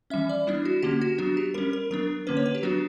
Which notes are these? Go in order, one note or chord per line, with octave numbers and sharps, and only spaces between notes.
E3 G3 C#4 E5
D5
G3 B3 D4 E4
F#4
D3 A#3 C#4 G4
F#4
F#3 B3 D4 F#4
G4
G3 C#4 A#4
A#4
F#3 B3 D4 A#4
D3 A#3 C#4 B4
C#5
B4
G4
F#3 B3 D4 F#4